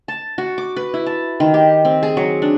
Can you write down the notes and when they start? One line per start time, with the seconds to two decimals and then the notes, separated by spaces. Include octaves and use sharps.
0.08 A5
0.38 F#4
0.58 D6
0.76 B4
0.94 E4
1.06 A5
1.40 D#3
1.54 G4
1.85 C4
2.03 G#4
2.17 F#3
2.42 D4